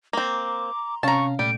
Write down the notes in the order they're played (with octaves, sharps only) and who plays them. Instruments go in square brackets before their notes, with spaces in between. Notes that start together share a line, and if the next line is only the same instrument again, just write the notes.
[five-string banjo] A#3 C4 [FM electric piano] A#5 C6 [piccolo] D6
[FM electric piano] C3 C#4 F5 [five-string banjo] A5 A#5 [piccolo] C#6
[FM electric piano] A#2 A3 [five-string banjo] G3 [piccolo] D7